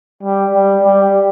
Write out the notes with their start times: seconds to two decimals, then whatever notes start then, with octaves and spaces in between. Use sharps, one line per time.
0.23 G3
0.53 G3
0.84 G3